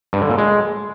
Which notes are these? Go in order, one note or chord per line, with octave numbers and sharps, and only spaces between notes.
G2
D3
A#2
G#3